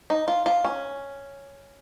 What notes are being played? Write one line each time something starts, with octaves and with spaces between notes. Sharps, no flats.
D#4
F4
F4
C#4